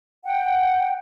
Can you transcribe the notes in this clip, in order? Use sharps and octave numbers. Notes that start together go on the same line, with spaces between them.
F#5 G5